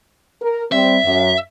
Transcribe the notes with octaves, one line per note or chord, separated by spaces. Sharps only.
A#4
G3 C4 E5
F#2